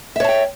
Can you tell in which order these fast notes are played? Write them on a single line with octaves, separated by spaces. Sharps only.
E5 C#5 A5 G5